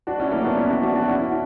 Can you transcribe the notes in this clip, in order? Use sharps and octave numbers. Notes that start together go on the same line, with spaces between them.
D4 F#4
C#4 E4
A#3 C#4
B3 D4
C#4 E4
D4 F#4
D4 F#4
D4 F#4
C#4 E4